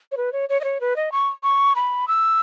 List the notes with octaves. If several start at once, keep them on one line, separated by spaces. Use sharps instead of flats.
C#5
B4
C#5
C#5
D#5
C#5
B4
D#5
C#6
C#6
B5
E6